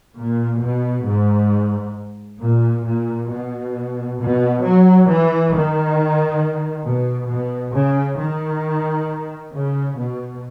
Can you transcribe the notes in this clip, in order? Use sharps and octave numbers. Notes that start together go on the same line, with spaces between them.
A#2
B2
G#2
A#2
A#2
B2
B2
F#3
E3
D#3
B2
B2
C#3
D#3
C#3
B2